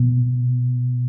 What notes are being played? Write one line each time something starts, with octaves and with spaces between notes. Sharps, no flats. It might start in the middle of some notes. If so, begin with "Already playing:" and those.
Already playing: B2